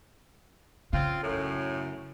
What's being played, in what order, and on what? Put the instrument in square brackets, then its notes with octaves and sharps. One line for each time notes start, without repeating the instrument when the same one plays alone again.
[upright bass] C#3 [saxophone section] C4 F4
[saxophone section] F#2 A2